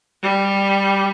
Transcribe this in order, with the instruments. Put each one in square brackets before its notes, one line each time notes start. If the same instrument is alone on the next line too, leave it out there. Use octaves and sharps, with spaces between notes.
[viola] G3